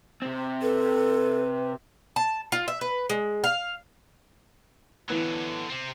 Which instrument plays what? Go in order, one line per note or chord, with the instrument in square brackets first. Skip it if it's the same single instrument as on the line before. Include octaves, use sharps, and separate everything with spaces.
[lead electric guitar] C3 C4
[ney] A4 [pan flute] B4
[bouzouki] A5
F4
E5
B4
G#3
F5
[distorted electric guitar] D3 F#3 [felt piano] E3 B3
[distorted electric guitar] C3 C4